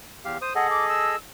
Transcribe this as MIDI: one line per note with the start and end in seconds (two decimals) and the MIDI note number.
0.25 0.38 40
0.25 0.38 67
0.25 0.38 77
0.42 0.53 72
0.42 0.53 87
0.55 1.16 68
0.55 1.16 69
0.55 1.16 75
0.55 0.67 78
0.71 0.86 86
0.88 1.17 88